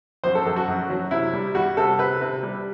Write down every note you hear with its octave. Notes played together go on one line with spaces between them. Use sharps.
F#2 C5
A4
F#2 A4
F#4
F#2
F#3
C3 E4
G3
G3 F#4
C3 A4
C3 B4
C3
G3